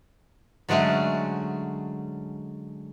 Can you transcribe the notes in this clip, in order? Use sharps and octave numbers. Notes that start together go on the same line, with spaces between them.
D3 F#3 G#3 A3 C#4